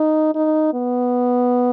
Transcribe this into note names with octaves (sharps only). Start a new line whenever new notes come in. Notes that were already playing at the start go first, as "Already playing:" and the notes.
Already playing: D#4
D#4
B3